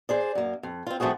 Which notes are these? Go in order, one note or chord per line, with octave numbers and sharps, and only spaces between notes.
G#4 C5 D5
F#2 A#3
F2
C4 F4
D#3 F3 A3 C4 F#4 G#4